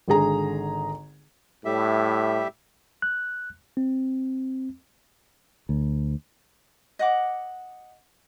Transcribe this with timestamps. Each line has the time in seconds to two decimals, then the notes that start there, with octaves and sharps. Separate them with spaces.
0.08 G#1 D3 G#4 A#5
1.65 A2 G3 G4 E5
3.02 F#6
3.77 C4
5.69 D2
6.99 D#5 F#5 D6